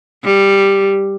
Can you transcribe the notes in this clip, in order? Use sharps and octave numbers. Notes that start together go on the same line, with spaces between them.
G3